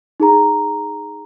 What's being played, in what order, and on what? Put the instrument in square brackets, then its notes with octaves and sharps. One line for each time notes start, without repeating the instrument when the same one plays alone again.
[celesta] D#4 G#4 A#5